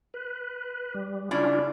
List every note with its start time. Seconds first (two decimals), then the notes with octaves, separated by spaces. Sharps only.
0.14 B4
0.95 G3
1.31 C#3 C#4 D4 E4 F4 D5